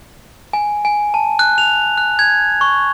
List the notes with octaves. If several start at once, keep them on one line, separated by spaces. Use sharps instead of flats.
G#5
G#5
A5
F#6
F7
F#6
G#6
C#6